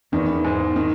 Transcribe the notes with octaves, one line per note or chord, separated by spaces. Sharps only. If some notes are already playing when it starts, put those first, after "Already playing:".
E2 D#3
G#2
D#3